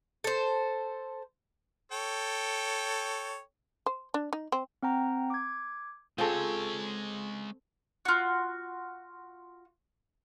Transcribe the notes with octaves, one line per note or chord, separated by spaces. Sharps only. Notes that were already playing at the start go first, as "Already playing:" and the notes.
A4 C5
A4 C#5 G5
C5
D4
D#4
C4
C4 F#5 G5 A#5
D6 G#6
G#3 C4 F4 G#4 A4 C#5
F4 F#4